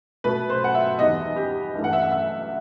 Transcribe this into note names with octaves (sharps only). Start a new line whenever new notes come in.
B2 A3 B4
C5
F#5
E5
E2 D#3 G3 B3 D#5
G4
G2 E3 A3
F#5
E5
F#5
E5